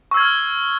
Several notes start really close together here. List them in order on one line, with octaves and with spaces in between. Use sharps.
C#6 E6 G#6 F6